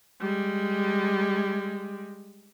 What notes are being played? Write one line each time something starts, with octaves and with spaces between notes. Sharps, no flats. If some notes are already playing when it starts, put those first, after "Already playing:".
G3 G#3